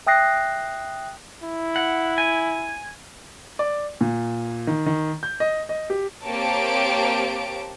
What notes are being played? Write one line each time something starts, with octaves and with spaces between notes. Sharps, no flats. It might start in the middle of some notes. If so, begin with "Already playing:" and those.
E5 G5 D#6 F#6 A#6 C7
E4
F#5
G#5
D5
A#2
D#3
D#3
G6
D#5
D#5
G4
A#3 C4 G4 C#5 A5 D7